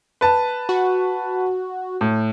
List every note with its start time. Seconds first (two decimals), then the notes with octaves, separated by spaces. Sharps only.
0.21 B4 A5
0.69 F#4
2.01 A2